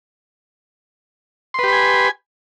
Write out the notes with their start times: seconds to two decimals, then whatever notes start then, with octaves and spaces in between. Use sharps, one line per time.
1.54 C6
1.59 B4
1.63 G4
1.68 B5
1.73 G#5